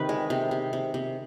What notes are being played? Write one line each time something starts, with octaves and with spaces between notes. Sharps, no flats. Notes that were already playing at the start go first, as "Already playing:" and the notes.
Already playing: C3 D#3 B4
G#3
C3
C3
C3
C3